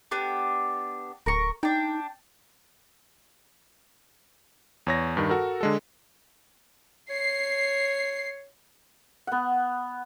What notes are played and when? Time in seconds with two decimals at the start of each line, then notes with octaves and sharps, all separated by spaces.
0.11 B3 D4 G4
1.26 D1 A#4 C#6
1.63 D4 D#4 G5
4.87 E2 C#5 A#6
5.17 G2 D#3
5.29 F#4 A4 A#4
5.61 D3 G#3 A4
7.10 C#5 C7
9.27 B3 F#5